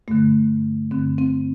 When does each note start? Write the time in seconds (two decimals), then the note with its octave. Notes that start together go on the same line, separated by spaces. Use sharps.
0.08 G2 D3 A3
0.91 G2 D3 C4
1.18 C4